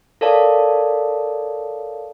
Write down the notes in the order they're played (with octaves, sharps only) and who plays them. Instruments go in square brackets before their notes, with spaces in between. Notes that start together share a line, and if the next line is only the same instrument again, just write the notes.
[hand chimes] A4 A#4 C#5 D5 F5 A5